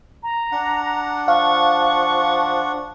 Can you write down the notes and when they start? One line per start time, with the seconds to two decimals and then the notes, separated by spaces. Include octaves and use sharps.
0.23 A#5
0.52 D4 F#5
1.28 F3 F5 C#6